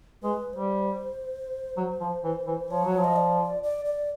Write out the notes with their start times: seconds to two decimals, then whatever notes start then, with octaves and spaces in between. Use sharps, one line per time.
0.23 G#3 B4
0.53 G3 C5
1.77 F#3
2.00 F3
2.24 E3
2.47 E3
2.70 F3 C#5
2.84 F#3
2.97 F3
3.04 D#5
3.16 D5
3.63 D5
3.85 D5